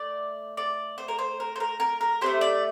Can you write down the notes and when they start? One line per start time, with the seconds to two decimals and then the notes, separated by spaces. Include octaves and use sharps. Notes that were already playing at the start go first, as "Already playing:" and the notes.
Already playing: A3 D5
0.57 D5
0.98 C5
1.08 A#4
1.19 C5
1.40 A#4
1.56 C5
1.60 A#4
1.80 A#4
2.01 A#4
2.21 D4 G4 C5
2.26 A3
2.41 D5